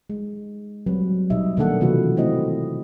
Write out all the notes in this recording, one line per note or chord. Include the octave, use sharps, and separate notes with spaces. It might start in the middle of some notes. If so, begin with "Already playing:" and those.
G#3
F#3 G3 C4 B4
B2 G3 D#4 D#5 E5
B2 D#3 A#3 D4 A4 F#5
C3 E3 A#3 F4 F#4 B4
D#3 A3 C4 E4 D#5